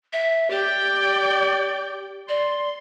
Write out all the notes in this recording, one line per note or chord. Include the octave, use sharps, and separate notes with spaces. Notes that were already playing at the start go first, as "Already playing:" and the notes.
E5
G4 D5 G5
D5 C6